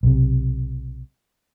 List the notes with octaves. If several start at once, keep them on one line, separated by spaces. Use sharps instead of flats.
B1 C3